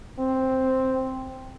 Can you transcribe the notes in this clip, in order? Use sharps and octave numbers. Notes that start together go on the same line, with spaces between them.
C4